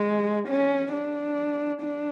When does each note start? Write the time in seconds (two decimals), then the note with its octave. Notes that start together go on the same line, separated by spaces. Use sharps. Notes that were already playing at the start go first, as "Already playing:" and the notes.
Already playing: G#3
0.48 C#4
0.92 D4
1.81 D4